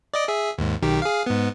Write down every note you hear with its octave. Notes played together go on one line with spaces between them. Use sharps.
D5 D#5 D6
G#4 E5
D#2 G#2
B1 D#3 G4
G#4 F5
G#2 B3